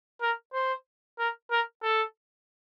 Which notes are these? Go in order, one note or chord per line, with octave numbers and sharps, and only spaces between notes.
A#4
C5
A#4
A#4
A4